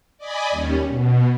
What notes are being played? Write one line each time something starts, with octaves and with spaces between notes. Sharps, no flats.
D5 D#5 G#5 B5
D#2 G3 C#4
B2